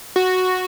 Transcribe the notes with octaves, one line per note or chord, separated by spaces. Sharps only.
F#4